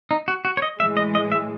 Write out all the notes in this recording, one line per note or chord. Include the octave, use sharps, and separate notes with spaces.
D#4
F#4
F#4
C#5
D#5
A2 E3 G#3 E5
D#5
D#5
E5